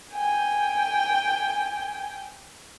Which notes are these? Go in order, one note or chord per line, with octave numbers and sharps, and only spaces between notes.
G5 G#5